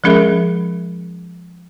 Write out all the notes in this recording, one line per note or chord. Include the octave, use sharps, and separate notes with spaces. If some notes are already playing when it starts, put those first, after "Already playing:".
F3 G#3 C#4 G#4 A#4 E5